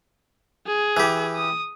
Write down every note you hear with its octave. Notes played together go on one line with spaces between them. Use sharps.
G#4
E3 G4
D#6